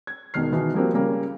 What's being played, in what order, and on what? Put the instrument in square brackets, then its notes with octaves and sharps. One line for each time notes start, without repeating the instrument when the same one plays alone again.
[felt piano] G#6
E1 B2 D#3 F6 C7
B2 D#3 E3
F3 G3 A#3 C4 F#4
C#3 G3 A#3 C#4